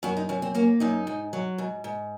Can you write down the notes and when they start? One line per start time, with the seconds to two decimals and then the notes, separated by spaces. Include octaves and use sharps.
0.03 F#2 F#4
0.17 D#4
0.29 F#2 C#4
0.42 C4
0.55 A#3 C#4
0.80 F#2 D#4
1.07 G#2
1.33 F#3
1.58 G#2
1.84 G#2